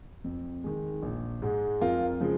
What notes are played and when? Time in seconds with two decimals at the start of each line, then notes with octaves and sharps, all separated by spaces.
0.24 F2
0.64 D#3 G#3
1.02 A#1
1.42 G#2 G#3
1.81 F2 F4 A#4
2.20 C#3 F3 G#3